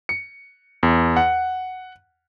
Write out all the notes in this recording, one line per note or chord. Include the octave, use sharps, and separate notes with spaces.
C#7
E2
F#5